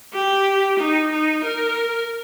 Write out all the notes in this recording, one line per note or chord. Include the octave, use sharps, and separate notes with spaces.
G4
D#4
D#4
A#4